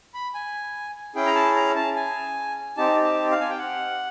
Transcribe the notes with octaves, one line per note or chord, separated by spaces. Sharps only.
B5
G#5
C#4 E4 G#4 G5
A#5
A5
A#5
A5
G#5
C4 D#4 G4 A5
A5
F5
G#5
G5
F#5